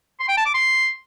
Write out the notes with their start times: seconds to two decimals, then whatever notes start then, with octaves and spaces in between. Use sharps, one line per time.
0.20 C6
0.28 G5
0.37 A5
0.46 D6
0.54 C6